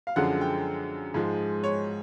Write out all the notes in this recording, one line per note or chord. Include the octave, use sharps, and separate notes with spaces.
F5
F#2 D3 F3 G#3 F#5
G5
G#2 F3 G#3
C#5